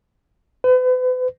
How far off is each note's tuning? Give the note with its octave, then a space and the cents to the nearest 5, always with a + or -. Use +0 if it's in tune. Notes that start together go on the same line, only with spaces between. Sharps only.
B4 +40